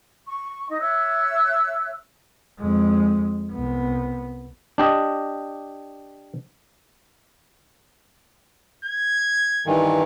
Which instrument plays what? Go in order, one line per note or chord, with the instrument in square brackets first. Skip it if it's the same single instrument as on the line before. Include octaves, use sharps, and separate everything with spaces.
[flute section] C#6
D#4 D#5
C#5 E5 E6 F#6
[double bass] F2 G#3
C2 B3
[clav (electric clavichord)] D4 G4 D#5
[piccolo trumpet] G#6
[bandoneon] G2 D#3 E3